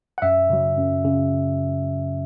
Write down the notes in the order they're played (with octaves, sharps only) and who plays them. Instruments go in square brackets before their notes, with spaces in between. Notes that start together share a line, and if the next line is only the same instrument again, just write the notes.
[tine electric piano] F#5
F#2 E5
C#3 F#3
F#2
C#3